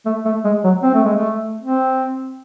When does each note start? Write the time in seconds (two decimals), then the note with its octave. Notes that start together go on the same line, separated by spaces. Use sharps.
0.06 A3
0.25 A3
0.45 G#3
0.64 F#3
0.83 C4
0.94 A3
1.05 G#3
1.16 A3
1.61 C4